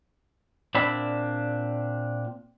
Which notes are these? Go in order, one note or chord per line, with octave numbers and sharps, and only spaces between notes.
A#2 C4 D4 E5 B5